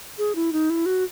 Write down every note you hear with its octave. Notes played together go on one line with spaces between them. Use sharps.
G#4
E4
D#4
E4
F#4